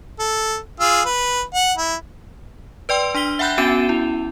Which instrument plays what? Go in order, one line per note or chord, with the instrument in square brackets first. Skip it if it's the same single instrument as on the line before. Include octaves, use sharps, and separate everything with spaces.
[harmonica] A4
F4 G#4 E6
B4
F#5
E4
[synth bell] B4 D5 G5 C6 E6
D4 C6 B6 G7
E5 F#5 G5 B5 F#6 G6
B3 C#4 F#4 G#5 D#7 E7
E4